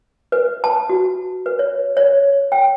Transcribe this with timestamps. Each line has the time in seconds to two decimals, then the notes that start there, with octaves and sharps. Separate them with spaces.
0.32 B4
0.64 A5
0.89 F#4
1.46 B4
1.59 C#5
1.97 C#5
2.52 G5